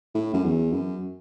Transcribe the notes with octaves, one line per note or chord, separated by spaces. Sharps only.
A2
F#2
E2
F#2